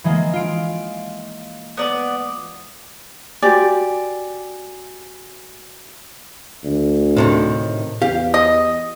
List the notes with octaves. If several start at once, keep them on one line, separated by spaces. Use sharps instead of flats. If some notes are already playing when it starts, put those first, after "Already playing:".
E3 G#3 A#3
F4 D7
B3 D5
F#4 G4 D5 G#5
D2
A2 C3 D#3
E2 G4 F5
D#5